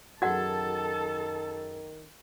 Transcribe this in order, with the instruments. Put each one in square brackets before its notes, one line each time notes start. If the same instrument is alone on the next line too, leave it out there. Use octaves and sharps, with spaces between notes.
[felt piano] F#2 G#4 G#6 [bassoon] D#3 [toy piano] F#4 F#5 [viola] A4 A5